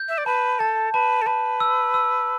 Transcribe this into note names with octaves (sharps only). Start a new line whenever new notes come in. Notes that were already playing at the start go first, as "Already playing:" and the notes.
Already playing: G6
E5
D5
B4 A5
A4 A5
B4 A5
A4
B4 A5
E6
E6